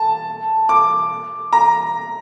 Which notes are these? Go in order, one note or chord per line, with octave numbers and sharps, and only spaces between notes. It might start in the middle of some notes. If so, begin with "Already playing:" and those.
Already playing: A5
D6
A#5